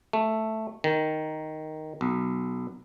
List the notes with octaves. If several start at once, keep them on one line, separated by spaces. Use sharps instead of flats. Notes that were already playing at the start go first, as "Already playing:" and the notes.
A3
D#3
B1